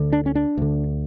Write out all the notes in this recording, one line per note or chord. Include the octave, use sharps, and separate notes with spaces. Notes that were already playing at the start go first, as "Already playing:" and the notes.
Already playing: D2 D3
D4
C#4
D4
D2 D3